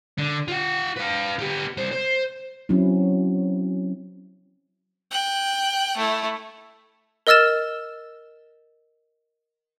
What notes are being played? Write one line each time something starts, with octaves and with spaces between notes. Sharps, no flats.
D3
F4 F#5
B4 F5
B3 G4
C2 C5
C5
F#3 C4 C#4 E4
G5 F#6
A3 E4
A#4 D#5 E6 F6 A6 E7